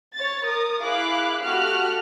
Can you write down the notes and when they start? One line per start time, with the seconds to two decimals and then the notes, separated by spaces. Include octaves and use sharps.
0.15 C#5 A6
0.46 A#4 D#6
0.83 E4 G#4 F5 B5 D6 F#6
1.44 A3 F#4 G4 F6 F#6